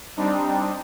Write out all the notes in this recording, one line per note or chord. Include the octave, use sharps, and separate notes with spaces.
G3 C4 D4 D#4